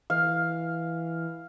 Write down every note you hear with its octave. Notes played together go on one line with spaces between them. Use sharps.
E3 F5